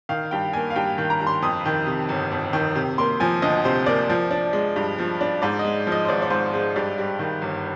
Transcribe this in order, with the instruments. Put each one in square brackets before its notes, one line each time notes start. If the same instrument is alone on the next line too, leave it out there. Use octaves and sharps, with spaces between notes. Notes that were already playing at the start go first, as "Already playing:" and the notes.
[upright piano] D#3 F5
G2 G5
A#3 G#5
F5
G2 G5
D#3
A#5
G2
C6
F2 D#6
D#3
C3
G1
F2
D#3
C3
A#3 C6
F3 G#5
D2 D#5
C3 C5
A#3 D5
F3
D4
G#3
G2
F3
D4
G#2 D5
D#5
G#3
F3
D#5
C5
G#1 D5
D5
G#2 C5
G#3 C5
G2 D5
G3
D#3
G1